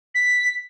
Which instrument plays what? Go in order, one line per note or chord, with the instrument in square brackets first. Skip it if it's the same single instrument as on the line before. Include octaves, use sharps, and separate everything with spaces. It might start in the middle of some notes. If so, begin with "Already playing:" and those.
[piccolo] B6